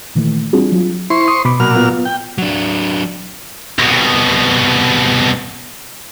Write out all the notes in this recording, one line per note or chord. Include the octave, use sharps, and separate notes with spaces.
A#2 D#3 E3 A3
G3 C4 D4 F4 F#4 G#4
F#3 F4
E4 C5 C6 C#6
D#6
B2 B5 D6
A#2 F#3 F6
B3 F4
G5
F#3 D4
C2 B2